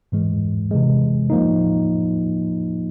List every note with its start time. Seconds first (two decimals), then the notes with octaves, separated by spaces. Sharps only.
0.12 G#2 E3 G#3
0.71 C3 E3 G#3
1.30 F3 A#3 D#4